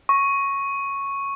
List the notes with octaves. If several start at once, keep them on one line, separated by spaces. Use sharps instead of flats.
C#6